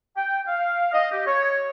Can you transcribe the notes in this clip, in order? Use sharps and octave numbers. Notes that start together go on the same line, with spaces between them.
G5
F5
D#5
G4
C#5